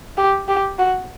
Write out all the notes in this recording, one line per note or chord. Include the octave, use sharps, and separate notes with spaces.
G4
G4
F#4